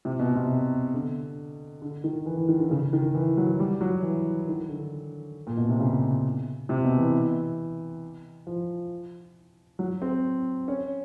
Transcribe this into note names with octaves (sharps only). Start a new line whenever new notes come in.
C3
B2
C3
D3
D3
D#3
E3
E3
D#3
D3
C#3
D#3
E3
F#3
G3
F#3
E3
D#3
D3
A#2
B2
C3
C#3
C3
B2
E3
F3
F#3
C4
C#4